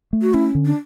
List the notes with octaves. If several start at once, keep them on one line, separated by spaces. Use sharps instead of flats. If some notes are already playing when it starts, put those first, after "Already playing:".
A3
F#4
C#4 E4
D3
D4